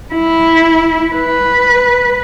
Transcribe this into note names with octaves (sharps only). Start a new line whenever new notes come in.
E4
B4